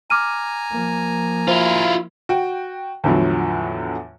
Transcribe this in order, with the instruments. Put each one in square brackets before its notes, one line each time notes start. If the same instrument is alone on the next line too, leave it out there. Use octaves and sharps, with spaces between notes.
[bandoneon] G#5 A#5 [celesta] D6 F6 D#7
[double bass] F3 A#3
[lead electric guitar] E4 F4 [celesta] C5
[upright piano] F#4 G5
E2 A2 D3 F3 F#3